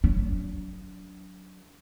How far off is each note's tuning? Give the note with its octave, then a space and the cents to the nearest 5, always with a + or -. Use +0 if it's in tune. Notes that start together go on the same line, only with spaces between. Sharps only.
F#3 +0 D4 -35